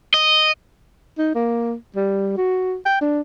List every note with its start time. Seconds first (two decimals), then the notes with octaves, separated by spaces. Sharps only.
0.14 D#5
1.18 D#4
1.35 A#3
1.96 G3
2.37 F#4
2.86 G5
3.01 D4